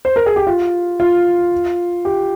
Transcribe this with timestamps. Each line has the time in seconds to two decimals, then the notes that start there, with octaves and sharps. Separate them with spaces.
0.05 C5
0.16 A#4
0.26 G#4
0.36 G4
0.47 F4
1.00 F4
2.05 G4